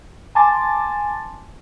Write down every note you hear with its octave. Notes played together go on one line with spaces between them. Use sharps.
G#5 A5 C6 D6 A6